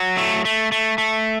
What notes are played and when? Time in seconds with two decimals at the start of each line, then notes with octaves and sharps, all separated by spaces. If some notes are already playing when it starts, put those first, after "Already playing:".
Already playing: F#3
0.17 A3
0.45 A3
0.72 A3
0.98 A3